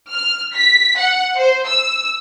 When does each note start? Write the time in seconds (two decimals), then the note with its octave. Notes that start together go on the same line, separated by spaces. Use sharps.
0.11 F6
0.53 B6
0.98 F#5
1.37 C5
1.66 E6